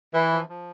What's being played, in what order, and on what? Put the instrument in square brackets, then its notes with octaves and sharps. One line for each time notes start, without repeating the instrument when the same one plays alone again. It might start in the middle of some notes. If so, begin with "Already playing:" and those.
[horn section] E3 [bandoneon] E4
[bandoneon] F3
F3